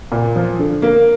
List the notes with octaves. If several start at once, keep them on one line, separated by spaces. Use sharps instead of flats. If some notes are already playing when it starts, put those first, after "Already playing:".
A#2
F3
D3
A#3